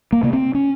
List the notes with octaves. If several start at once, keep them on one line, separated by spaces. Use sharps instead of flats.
A#3
C3 A#3
C4
C#4